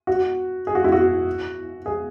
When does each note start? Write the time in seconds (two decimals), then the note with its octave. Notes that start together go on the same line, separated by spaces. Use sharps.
0.07 F#4
0.67 G#4
0.75 F#4
0.84 E4
0.92 F#4
1.86 G#4